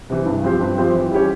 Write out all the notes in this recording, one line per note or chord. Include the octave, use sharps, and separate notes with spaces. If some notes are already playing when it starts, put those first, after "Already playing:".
C3 E3
G2
F3 C4 G4 C5
G2
F3 C4 G4 C5
E3
G3 C#4 G4 C#5